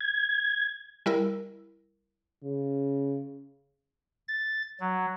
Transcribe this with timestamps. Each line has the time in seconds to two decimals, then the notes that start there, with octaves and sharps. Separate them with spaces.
0.01 G#6
1.06 G3 E4 A#4
2.43 C#3
4.28 A6
4.80 F#3